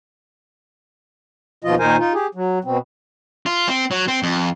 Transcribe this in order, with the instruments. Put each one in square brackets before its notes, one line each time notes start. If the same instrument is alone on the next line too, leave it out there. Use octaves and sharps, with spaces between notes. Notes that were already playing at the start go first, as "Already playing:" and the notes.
[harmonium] D#2 B2 F3 F4 D#5
A#2 D#3 D#4 A#4 C5 G#5
D#4 F4
G4 G#4
F#3
B2 C4
[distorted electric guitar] F4
C4
F#3
C4
F2